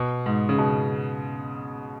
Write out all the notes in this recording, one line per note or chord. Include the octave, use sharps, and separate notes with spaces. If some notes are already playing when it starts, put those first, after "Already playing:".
Already playing: B2
G#2
C#3
B2